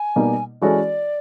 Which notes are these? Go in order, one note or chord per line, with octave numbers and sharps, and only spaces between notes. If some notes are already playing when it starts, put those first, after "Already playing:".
Already playing: G#5
B2 G3 A#3 D#4
E3 G#3 C#4 F#4 A4 D5